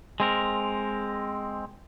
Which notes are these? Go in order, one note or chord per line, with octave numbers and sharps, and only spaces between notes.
G#3 C4 A#4